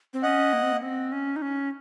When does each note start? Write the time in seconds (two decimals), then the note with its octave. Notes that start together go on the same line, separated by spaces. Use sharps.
0.13 C4
0.23 C#4 D#5 F#5
0.53 A#3
0.63 C4
0.72 A#3
0.82 C4
1.12 C#4
1.36 D#4
1.42 C#4